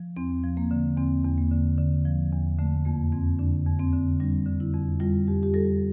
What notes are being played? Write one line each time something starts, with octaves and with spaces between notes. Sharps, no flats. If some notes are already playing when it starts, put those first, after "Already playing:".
Already playing: F3
E2 C4
F3
A#3
D3
E2 C4
E2
A#3
D3
D3
F3
E2
D3 A3
F2 A#3
F2 C4
D3 D4
F2
C4
D3
G3 D4
D3
E4
F2
G3 F4
F2 G4
G4
G3 A4